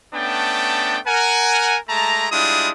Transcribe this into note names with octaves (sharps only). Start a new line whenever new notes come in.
A3 B3 C#4 D4 G5 A5
A#4 F#5 G#5
G#3 A3 A5 A#5
G3 G#3 D4 E4 F4 D#6